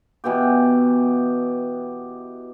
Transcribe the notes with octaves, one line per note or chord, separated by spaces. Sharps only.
B2 E3 B3 G4